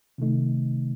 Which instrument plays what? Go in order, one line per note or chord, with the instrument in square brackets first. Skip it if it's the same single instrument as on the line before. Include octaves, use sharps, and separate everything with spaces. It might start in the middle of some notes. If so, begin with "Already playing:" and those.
[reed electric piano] C3 D#3 A3 D#4